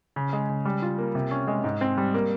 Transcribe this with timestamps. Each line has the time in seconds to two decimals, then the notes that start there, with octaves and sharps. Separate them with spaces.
0.16 C#3
0.33 G#3
0.49 C#3
0.65 G3
0.82 F4
0.98 A#3
1.15 C3
1.31 C#4
1.48 G#3
1.64 G#2
1.81 C4
1.98 G3
2.14 A#3